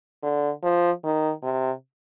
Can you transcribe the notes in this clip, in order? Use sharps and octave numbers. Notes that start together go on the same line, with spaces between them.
D3
F3
D#3
C3